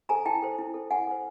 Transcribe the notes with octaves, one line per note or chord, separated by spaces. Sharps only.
A4 C5 G#5 A#5
E4 G5 A5
A4 C5
E4
A4 C5
E4 F#5 G#5
A4 C5